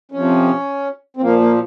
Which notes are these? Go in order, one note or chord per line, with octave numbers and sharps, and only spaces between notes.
F2 C3 F3 C#4
C4
A#2 F3 A#3
A#3